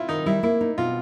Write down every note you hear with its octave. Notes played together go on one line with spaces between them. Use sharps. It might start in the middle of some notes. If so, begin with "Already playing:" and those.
Already playing: E4 F4
D#3 D#4
G3 E4
A#3 E4
D#4
B2 F4